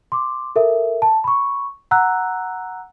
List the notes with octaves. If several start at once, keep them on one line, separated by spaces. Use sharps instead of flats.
C6 D6
A4 A#4 E5
A5
B5 C#6
F#5 A#5 E6 F#6